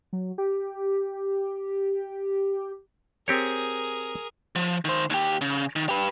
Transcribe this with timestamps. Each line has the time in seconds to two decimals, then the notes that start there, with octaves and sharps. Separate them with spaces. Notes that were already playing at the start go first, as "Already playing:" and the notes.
0.13 F#3
0.38 G4
3.28 C4 G4 G#4 A#4 C#5
4.56 F3
4.85 D#3 C5
5.10 D#2 G4
5.41 C#3
5.76 D#3
5.89 G4 B4